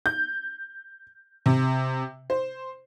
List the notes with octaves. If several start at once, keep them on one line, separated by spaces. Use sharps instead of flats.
G6
C3
C5